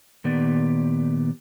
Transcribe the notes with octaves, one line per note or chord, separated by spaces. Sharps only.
A#2 D#3 B3 G4 D5